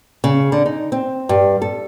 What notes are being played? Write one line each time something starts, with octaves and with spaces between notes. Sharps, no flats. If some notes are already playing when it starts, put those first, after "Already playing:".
C#3
D3
D#4
C4
G2
A4